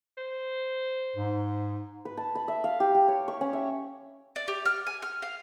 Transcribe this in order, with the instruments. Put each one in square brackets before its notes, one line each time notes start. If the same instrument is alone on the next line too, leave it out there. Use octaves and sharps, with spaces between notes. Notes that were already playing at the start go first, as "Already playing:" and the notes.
[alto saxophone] C5
[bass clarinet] G#2
[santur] B4
A5
B5
E5
F5
G4
G4
C#5
C#6
C#4
E5
[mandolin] D5
G4
F6
G#5
F6
F5